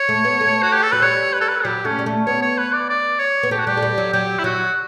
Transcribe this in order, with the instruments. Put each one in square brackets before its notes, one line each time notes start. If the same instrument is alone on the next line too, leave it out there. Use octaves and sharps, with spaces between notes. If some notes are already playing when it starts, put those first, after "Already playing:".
Already playing: [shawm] C#5
[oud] A3
B3
A3
[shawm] F#4
G4
A4
[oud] F#3 [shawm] B4
[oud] G3 [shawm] C#5
[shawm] B4
A4
B4
[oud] F#3 [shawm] G4
[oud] A3 [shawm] C#4
[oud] G3
A3
[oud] B3 [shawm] C#5
[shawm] C#5
B4
D5
D5
C#5
[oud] B3
[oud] A3 [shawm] G4
[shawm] F#4
[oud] G3 [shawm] G4
[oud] A3
G3
F#3
[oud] F#3 [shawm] G4
[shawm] E4
[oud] F#3 [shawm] F#4